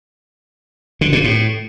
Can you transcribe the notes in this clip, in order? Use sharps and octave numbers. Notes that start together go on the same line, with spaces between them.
D3
A#2
A2